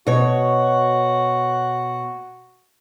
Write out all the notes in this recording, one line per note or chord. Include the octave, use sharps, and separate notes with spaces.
B2 F#4 C#5